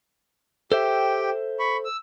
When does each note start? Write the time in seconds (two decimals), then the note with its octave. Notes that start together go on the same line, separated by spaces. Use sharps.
0.72 G4 A4 C5 E5 G5
1.59 B5 C#6
1.85 E6